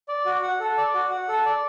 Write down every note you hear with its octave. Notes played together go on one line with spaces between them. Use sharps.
D5
F#4
F#5
A4
D5
F#4
F#5
A4
D5